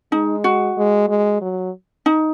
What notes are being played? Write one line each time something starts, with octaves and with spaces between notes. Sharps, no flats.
G#3 D#4
F#4
G#3
G#3
F#3
D#4